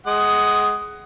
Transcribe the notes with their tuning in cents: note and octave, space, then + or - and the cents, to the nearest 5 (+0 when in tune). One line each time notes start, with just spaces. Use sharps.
G#3 +15 F#5 +15 D#6 +0